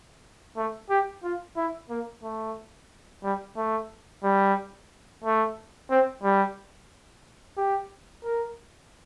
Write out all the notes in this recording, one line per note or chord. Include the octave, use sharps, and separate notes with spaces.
A3
G4
F4
E4
A#3
A3
G3
A3
G3
A3
C4
G3
G4
A#4